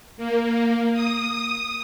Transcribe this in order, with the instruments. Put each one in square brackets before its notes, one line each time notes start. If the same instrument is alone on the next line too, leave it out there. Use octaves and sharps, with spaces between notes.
[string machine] A#3
D#6